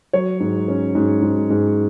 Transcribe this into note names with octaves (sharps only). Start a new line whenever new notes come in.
F#3 C#5
G#2
C#4
G#2
G#2
G#2